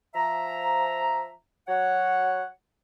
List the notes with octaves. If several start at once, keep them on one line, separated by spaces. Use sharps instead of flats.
F3 E5 A#5
F#3 C#5 F#5